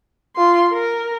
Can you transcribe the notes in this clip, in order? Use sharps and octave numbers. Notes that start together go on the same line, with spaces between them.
F4 C6
A#4